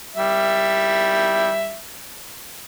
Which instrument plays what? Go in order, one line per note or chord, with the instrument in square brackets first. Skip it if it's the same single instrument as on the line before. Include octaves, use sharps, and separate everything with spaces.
[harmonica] G3 E5